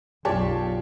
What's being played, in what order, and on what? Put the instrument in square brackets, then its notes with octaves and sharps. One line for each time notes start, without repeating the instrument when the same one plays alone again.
[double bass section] B1 F#2 [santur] F4 D5 [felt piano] G4 C#5 A5